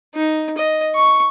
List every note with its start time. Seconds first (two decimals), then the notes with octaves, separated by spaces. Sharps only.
0.15 D#4
0.58 D#5
0.96 C#6